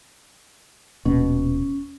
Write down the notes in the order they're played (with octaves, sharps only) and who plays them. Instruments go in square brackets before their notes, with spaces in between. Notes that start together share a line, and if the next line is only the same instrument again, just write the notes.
[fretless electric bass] D#1 B2 [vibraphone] C#4